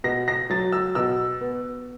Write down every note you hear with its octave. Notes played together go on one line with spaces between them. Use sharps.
B2 A#6
A#6
F#3 A6
E6
B2 E6
B3